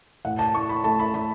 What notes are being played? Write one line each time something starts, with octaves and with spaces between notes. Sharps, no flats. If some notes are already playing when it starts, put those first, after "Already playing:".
A2 F#5
A5
A2 C#6
B5
A3 A5
B5
A3 B5